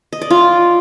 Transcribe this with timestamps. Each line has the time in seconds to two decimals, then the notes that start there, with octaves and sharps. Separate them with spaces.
0.13 D#5
0.22 D5
0.30 F4